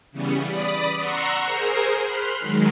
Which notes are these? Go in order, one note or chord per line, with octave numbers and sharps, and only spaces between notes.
C#3 E3 G3 B3 C#4
D5 B5 D#6
F#5 A#5 C6 C#6 E6
G#4 A#4 C5
B5 C6 F6 F#6
D#3 F#3 G#3